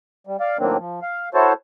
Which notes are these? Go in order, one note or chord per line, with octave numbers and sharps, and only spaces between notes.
G3
D5 F5
A2 D#3 F#3 A#3 C4 D4
F3
F5
E4 F#4 A4 C5 C#5 A5